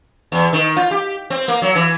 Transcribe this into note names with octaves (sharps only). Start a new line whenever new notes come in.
E2
D#3
F4
G4
C4
A#3
F#3
E3